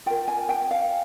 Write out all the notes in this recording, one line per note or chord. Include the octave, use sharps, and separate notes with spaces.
F4 A#4 G5
G#5
G5
F5